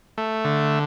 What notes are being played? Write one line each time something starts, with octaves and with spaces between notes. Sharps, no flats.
A3
D3